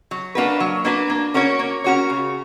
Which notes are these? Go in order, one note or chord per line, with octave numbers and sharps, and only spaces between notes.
F#3
A#3 D4 F#4 B4
F#3
A#3 D4 F#4 B4
A#3
C#4 F#4 A#4 C#5
A#3
C#4 F#4 A#4 C#5
C#3